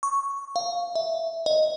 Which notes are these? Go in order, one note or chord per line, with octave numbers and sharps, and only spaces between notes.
C#6
F5
E5
D#5